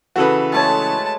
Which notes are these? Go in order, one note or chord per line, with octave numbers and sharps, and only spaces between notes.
C#3 E3 F#4 A4 B4
G#3 A3 C#5 A5